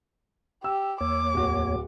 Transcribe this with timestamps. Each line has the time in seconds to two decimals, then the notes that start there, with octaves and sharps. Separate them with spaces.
0.64 G4 E6
1.01 E2 A#3 C#5 D6
1.34 D1 F#4